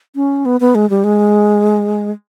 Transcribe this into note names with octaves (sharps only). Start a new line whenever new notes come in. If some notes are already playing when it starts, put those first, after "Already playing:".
C#4
B3
B3
G#3
G3
G#3